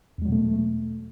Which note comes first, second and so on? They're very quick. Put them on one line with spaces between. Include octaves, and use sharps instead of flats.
E2 G#3 F#3 B2 A3